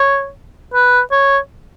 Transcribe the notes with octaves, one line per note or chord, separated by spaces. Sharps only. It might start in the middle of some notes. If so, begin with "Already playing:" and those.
Already playing: C#5
B4
C#5